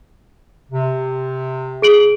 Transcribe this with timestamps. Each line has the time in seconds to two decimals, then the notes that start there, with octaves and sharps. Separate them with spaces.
0.71 C3
1.82 G#4 D7 F#7